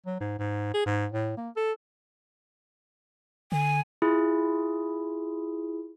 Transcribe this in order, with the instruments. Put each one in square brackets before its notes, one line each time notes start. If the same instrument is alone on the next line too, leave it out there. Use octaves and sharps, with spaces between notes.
[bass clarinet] F#3
G#2
G#2
G#4
G#2
A2
A#3
A4
[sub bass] D3 [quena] G#5
[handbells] E4 F4 G#4